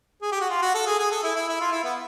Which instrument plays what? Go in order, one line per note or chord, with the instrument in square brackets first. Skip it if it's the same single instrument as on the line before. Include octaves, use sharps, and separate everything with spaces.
[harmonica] G#4
G4
F#4
F4
F#4
A4
G#4
G#4
A4
E4
E4
E4
F4
E4
B3